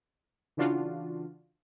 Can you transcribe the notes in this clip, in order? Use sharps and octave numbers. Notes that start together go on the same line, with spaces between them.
C#3 E3 D4 F4 F#4